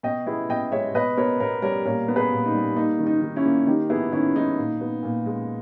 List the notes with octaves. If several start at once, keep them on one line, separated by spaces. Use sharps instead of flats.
B2 D#5 G5
B3 E4 G#4
B2 D#5 G5
G#3 C#5 E5
B2 B4 D#5
B3 A#4 C#5
B2 A#4 C#5
G3 A#4 C#5
A#2 A#4 C#5
B3
G#4 B4
A#2
D#4
G3
A#3 D#4
D#3
D#4
D#3
C#4 E4
A#3
D#3 D#4 G4
B3 E4 G#4
D#3 C#4 E4
G#3 D#4
A#2
B3
A#2
G#3